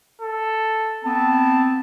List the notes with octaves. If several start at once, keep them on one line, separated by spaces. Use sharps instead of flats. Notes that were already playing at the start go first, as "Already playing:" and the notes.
A4
B3 C4 A5